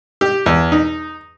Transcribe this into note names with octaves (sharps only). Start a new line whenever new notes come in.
G4
E2
D#4